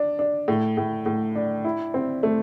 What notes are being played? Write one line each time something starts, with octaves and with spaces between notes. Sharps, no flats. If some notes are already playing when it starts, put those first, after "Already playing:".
Already playing: D4
D4
A2
A2
A2
D4
E4
C4
A3